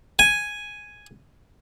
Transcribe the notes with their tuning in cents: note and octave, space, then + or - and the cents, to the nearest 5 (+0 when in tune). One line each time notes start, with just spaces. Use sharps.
G#5 +0